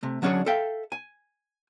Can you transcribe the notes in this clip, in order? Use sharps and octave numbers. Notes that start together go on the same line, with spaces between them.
C3 A3
D3 F#3 C#4 D4 G#4 C#5
A4 E5 F5 G5
G#5